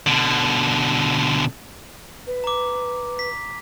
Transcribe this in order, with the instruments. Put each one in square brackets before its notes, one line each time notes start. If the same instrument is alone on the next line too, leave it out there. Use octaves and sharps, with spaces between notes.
[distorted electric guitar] B2 D3
[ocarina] B4
[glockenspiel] A#5 D6
B6